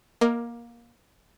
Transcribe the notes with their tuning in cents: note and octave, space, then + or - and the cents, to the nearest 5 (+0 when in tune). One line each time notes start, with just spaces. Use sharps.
A#3 +20 A#4 +0 D#5 +20